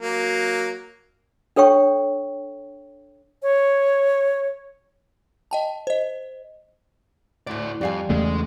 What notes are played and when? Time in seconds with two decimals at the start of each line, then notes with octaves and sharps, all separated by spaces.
0.02 F#3 A#3
1.56 D4 A4 C#5 G5 C#6
3.43 C#5
5.51 D#5 G5 A5
5.87 C5 D#5
7.47 D2 A2 E4 D5
7.81 F2 G3 F5 G#5
8.10 E2 C#3 G#3 A3